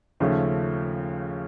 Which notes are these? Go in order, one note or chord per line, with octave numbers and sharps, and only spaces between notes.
D#2 C#3 F3 A3 C#4